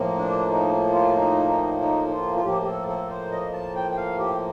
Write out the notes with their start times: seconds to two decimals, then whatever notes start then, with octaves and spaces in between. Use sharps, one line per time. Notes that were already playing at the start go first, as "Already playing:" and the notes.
Already playing: A2 F3 A#3
0.18 D4
0.50 D#4
0.94 F4
1.16 D#4
1.48 D#4
1.80 D#4
2.08 D#4
2.13 F4
2.36 F4
2.45 A2 F3 A#3 G4
2.61 G4
2.67 A4
2.88 A4
3.10 C5
3.32 D#5
3.53 A5
3.75 G5
3.91 G5
3.97 F5
4.19 G4